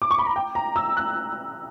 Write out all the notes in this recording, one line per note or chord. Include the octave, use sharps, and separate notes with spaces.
D6
C#6
B5
A#5
G5
A#5
E6
F#6